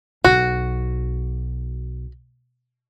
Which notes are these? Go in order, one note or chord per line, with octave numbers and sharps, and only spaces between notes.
B1 F#4